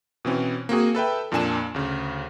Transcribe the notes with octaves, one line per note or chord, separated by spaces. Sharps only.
B2 E3 C4 C#4
A#3 C4 F#4 G#4
A4 B4 E5 G5
F2 A#2 A#3 D4 G#5 E7
D2 C#3